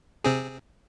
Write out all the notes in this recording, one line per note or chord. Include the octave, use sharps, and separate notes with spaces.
C3 C4 G#4